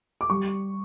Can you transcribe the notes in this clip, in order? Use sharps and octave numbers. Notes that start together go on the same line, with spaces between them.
D6
G3 C#6